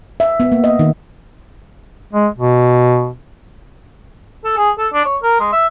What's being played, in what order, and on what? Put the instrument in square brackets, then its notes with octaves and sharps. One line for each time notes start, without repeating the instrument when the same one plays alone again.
[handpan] E5
B3
A#3
D#5
D#3
[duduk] G#3
B2
[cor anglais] A4
G#4
A4
D4
C#5
A#4
G#3
E5